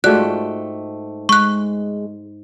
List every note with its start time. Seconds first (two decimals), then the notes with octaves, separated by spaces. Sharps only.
0.04 G#2 A3 F4 F#4 D5 G5 F#6
1.29 G#3 C#6 F#6